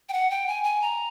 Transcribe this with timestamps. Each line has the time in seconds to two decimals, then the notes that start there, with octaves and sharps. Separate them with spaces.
0.09 G5
0.13 F#5
0.30 G5
0.48 G#5
0.64 G#5
0.82 A#5